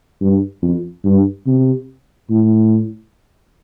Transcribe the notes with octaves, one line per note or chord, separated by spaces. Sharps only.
G2
F2
G2
C3
A2